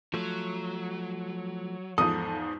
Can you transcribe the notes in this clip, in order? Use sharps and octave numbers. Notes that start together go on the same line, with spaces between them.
F3 F#3 A3
E2 G#2 F3 A4 D#6